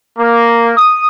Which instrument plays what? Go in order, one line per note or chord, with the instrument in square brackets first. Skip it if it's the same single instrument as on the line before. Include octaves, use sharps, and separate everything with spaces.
[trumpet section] A#3
D#6